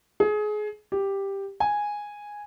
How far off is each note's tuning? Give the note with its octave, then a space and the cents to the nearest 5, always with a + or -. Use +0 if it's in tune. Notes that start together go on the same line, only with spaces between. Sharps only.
G#4 +25
G4 +5
G#5 -5